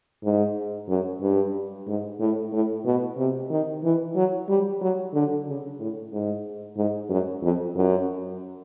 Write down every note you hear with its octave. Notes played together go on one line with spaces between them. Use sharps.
G#2
F#2
G2
G#2
A2
A2
B2
C3
D#3
E3
F#3
G3
F#3
D3
C#3
A2
G#2
G#2
F#2
F2
F#2